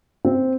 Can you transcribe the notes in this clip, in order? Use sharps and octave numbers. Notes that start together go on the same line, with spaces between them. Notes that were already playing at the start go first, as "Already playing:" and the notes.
C4